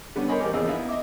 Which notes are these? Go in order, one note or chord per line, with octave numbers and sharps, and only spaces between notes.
D3 G3 B3 C#4
A#4 C5 C#5 D#5 G#5 B5
A1 G4 A#4 G#5 D6
E2 C#3 F3 A#3 D#5 E6
B3 D#4 E4 E5 F5 B5
D#5 E5 D6